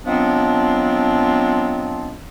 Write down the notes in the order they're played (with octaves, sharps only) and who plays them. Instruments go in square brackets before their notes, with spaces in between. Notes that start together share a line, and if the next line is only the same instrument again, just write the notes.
[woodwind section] F3 F#3 G#3 B3 C4 D4